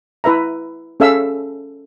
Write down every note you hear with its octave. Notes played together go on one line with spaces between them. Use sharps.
E4 B4 E5 A#5
C#4 G#4 A4 E5 F5 E6